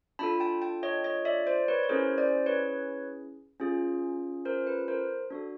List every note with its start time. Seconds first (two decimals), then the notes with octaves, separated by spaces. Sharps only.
0.19 D4 F4 A4 A5 B5
0.40 G5 A5
0.62 G5 A5
0.83 C#5 D#5
1.04 C#5 D#5
1.25 D5 E5
1.47 C5 D5
1.68 B4 C#5
1.83 C#5
1.89 C#4 E4 G#4 A#4 C5
2.18 C5 D5
2.46 B4 C#5
3.60 C#4 F4 G#4
4.45 A#4 C5
4.67 B4
4.88 A#4 C5
5.30 D4 F#4 A4